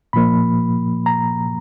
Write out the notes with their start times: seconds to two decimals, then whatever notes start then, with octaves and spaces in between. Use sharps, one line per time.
0.13 A#2 F3 A#3 B5
1.06 A#5